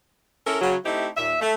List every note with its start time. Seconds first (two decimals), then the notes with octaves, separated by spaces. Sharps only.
0.46 C#4 E4 A4 A#4
0.60 C#3 F#3
0.84 A3 C4 D#4 E4 G4
1.17 D#2 A#2 E5
1.41 A3